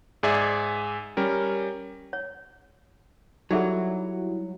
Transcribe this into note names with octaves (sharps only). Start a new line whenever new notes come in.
G#2 G#4 D5 E5 G#5
G3 C#4 A#4
C#5
F#3 G3 D#4 E4 F#4 G#4 A4